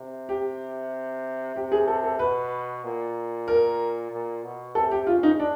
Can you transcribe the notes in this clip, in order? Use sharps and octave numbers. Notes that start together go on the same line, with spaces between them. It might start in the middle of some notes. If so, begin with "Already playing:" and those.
Already playing: C3
G4
C3 G4
G#4
A4
A4
B2 B4
A#2
A#4
A#2
B2
C3 A4
G4
C#3 F4
D#4
D4